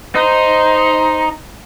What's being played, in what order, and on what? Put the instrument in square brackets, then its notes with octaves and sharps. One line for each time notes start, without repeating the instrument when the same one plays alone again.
[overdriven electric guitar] D#4 [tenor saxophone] C5